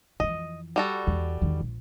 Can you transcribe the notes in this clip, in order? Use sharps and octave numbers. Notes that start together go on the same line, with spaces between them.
F2 E3 D#5
G3 F#4 A4
E2
E2 D#3
A#1